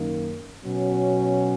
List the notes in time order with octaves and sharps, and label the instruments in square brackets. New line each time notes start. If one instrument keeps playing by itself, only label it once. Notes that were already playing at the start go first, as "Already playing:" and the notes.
Already playing: [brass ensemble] F#2 D#3 A#3
B2 F#3 C#4